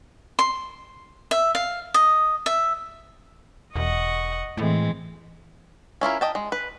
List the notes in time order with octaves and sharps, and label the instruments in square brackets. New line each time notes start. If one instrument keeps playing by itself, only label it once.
[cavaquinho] C6
E5
F5
D#5
E5
[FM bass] E1 [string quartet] D#5 F#5 C#6
[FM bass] A2 [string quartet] E3 G#3 C4
[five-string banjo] C#4 E4 F4 A#4
D#5 G5 A5
G#3
B4